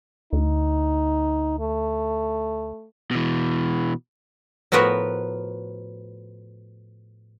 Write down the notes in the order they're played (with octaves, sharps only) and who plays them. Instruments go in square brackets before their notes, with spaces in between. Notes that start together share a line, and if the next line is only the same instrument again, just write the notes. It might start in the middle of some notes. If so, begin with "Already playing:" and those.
[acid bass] D2 [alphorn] D#4
[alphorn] A3
[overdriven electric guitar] B2 E3
[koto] A2 F3 B3 F#4 A#4 B4